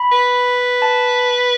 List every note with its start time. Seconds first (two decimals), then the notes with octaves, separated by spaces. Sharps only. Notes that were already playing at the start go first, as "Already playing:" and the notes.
Already playing: B5
0.12 B4
0.82 A5